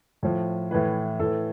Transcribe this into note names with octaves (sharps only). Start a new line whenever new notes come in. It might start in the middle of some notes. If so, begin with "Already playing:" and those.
A2 F3
A2 E3 B4
A2 E3 A4